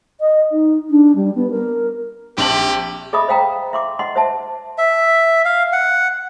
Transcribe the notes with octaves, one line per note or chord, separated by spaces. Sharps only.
D#5
D#4
D4
G3
B3
A#4
A#1 C4 G4 G5 A5 F#7
G#4 D#5 E5 B5 D#6
C5 F5 G5 A#5
E5 C6 D6
D#5 F#5 C6
C5 E5 A5
E5
F5
F#5